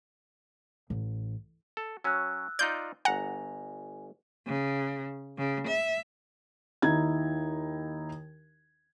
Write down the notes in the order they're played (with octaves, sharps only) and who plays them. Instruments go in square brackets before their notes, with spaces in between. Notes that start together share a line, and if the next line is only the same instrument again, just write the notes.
[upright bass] A1
[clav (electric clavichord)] A4
[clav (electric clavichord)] F#3 C#4 [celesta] E6 F#6
[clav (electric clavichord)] D#4 F4 D5 [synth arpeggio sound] G6
[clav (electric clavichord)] G1 A#5 [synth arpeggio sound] F#5 [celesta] G#5
[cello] C#3
C#3
E5
[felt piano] D#2 D#4 E4 G#6